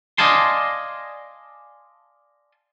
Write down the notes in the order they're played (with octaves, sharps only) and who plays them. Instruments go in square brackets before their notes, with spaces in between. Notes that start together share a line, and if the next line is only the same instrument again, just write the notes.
[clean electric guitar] D5 D#5 F5 G#5 A5 C6